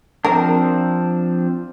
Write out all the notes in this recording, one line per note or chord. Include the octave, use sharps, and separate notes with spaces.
F3 C4 D4 A#4